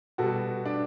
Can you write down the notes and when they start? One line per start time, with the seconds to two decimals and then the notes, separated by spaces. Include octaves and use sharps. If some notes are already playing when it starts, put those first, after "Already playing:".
0.18 B2 G3 F#4 A4
0.65 D4